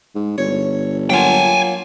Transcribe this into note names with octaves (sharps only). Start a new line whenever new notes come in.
G#2
G1 C#5
F#3 A#3 F4 G5 G#5